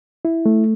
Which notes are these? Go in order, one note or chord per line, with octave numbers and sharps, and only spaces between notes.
E4
A3